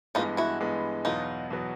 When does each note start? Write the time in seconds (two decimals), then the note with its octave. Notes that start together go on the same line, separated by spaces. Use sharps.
0.15 G2 E3 G#3 B3 D#4 F4
0.37 E4 F#4
0.60 G2 E3 G#3 B3
1.05 E2 B2 F#3 B3 D#4 F4
1.50 E2 B2 F#3 B3